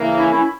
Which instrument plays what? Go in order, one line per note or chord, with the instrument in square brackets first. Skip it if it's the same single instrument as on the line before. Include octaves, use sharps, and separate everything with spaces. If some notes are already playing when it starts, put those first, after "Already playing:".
Already playing: [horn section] C#3 E3 A#3
[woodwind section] C#4 E4
C#4 E4